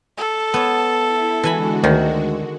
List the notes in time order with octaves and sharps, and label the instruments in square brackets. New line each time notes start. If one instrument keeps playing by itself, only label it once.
[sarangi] A4 [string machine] A5
[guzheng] B3 C#5
[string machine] E4
[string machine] D3 G#3 F#4 [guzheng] E3 G#5 B5
[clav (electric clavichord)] D2 [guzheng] D#3